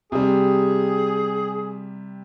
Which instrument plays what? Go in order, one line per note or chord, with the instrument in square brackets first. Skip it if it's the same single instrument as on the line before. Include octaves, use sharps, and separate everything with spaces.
[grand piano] C3 G3 [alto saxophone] G#4